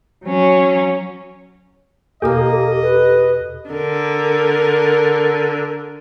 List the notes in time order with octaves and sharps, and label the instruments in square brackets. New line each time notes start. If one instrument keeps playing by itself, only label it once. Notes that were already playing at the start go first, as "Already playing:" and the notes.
[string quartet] F#3 C#4
[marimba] E2 B2 F6 [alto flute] A#3 [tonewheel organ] G4 A4 [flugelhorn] D#5
[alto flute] B4
[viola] D3 A#4